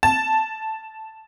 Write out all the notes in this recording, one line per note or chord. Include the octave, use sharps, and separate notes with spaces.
A5